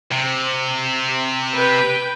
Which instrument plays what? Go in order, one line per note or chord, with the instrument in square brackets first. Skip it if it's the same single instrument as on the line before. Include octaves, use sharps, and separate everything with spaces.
[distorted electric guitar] C3
[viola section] B4 G5